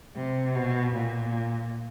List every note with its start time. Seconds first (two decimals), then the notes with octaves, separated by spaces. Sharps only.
0.16 C3
0.55 B2
0.95 A#2